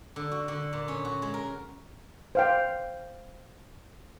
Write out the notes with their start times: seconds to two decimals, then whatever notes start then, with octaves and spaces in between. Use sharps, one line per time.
0.16 D3
0.32 F#4
0.48 D3
0.73 A#2
0.88 C#4
1.05 F#4
1.22 G#3
1.34 A#4
2.35 C5 F5 G5